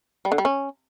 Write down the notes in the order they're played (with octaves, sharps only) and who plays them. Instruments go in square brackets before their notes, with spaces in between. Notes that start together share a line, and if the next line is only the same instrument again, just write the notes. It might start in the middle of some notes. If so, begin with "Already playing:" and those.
[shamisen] G3
D3
G3
C#4